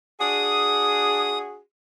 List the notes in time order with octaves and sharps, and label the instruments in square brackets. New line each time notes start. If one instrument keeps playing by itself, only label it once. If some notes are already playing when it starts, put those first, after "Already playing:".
[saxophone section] D4 F#4 G#4 [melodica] D#6